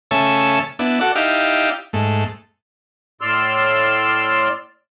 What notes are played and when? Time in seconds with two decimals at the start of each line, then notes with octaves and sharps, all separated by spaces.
0.11 C#3 A3 C#5 E5 G#5 A5
0.79 B3 D4 E4
1.01 F#4 A4 D5 F#5
1.16 D#4 E4 G4 D5 F5
1.93 G#2 A3
3.21 A2 D5 C6 E6 F6